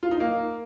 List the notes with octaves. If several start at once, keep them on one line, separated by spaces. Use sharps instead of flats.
F4
D#4
A#3